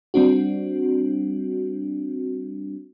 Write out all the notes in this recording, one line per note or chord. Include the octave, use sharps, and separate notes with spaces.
G3 C4 D4 F#4